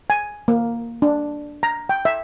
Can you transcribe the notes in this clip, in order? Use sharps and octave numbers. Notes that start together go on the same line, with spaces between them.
G#5
A#3
D4
A#5
G5
E5